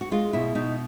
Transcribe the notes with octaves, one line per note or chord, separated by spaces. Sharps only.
F#4
G#3 F4
B2 E4
B2 D#4